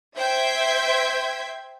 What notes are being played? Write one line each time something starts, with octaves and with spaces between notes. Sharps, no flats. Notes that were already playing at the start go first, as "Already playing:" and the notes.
C5 E5 G5 G6 G#6 B6